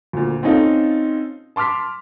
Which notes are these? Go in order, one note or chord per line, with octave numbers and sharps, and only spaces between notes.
D2 A#2
C4 C#4 D#4 F4 A4
A5 C6 D6 F6 B6